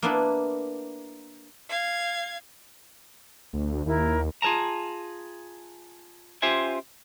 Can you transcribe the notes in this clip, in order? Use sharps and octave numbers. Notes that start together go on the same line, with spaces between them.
A#3 B3 D4 E4 A5 B5
F5 G#6
D2
D#2 E4 A#4
F4 G#4 A#4 A5 A#5
C#4 F4 G4 C5 E5 G#5